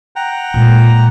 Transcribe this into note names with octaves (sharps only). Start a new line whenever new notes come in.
F#5 G5 A#5
A#2 G#3